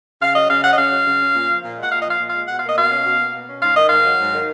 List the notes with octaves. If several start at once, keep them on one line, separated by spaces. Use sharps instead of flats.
C#3 F5
F#3 D#5
C#3 F5
C#4 F#5
D#5
C#3 F5
F#3
C#3
C#4
A#2
F3
A#2
G#3
F#5
A#2 F5
D#5
F3 F5
A#2
G#3 F5
B2 F#5
A#3 F5
D#5
B2 F5
C#4
B2
A#3
B2
C#4
G#2 F5
D#3 D#5
G#2 F5
F#3
G#2
D#3